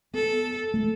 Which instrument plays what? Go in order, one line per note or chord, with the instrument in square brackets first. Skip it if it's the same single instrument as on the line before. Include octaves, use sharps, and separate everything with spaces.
[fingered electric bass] B3 [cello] A4
[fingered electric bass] A3